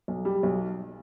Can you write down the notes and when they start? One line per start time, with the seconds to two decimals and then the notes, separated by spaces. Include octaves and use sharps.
0.08 B1
0.25 G3
0.43 B1